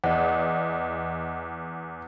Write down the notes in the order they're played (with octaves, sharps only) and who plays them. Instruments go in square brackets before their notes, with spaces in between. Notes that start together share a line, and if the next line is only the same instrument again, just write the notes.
[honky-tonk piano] E2 [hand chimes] D#5 F#5